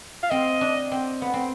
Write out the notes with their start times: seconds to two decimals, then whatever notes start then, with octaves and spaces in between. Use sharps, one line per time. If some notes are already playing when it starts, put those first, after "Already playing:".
0.23 F5
0.30 C4 D#5
0.61 D4
0.92 C4
1.22 B3
1.34 C4